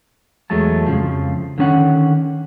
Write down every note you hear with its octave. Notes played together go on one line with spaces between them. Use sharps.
E2 F#3 G#3 A3 A5
F2 G#2 C#3 F3
D3 D#3 C#4 F#5